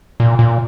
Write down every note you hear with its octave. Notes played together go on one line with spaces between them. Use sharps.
A#2
A#2